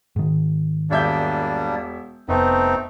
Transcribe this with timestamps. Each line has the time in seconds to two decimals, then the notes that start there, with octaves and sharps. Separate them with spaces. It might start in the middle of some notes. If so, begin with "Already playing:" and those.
0.16 G#2 D#3
0.90 E1 G3 A#3 D4 E5 G6
2.29 F1 A3 B3 C4 D#4